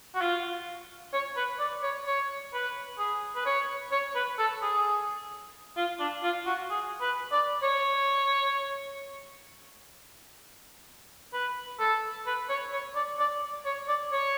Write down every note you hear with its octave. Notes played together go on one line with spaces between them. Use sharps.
F#4
F4
C#5
B4
D5
C#5
C#5
B4
G#4
B4
C#5
C#5
B4
A4
G#4
F4
D4
F4
F#4
G#4
B4
D5
C#5
B4
A4
B4
C#5
C#5
D5
D5
C#5
D5
C#5